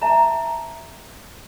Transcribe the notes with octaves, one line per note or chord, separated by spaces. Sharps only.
E5 A5 A#5